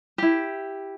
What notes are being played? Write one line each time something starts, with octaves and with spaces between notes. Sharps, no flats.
E4 G4